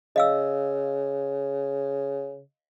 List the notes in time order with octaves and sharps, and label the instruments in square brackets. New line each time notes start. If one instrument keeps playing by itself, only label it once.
[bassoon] C#3 [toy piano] D#5 F5 E6